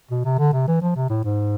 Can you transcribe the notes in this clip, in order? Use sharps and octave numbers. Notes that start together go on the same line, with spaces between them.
B2
C3
D3
C3
E3
F3
C3
A2
G#2